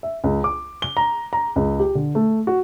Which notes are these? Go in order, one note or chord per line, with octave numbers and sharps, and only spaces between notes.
E5
C#2
D6
G7
A#5
A#5
C#2
G4
D3
A3
F#4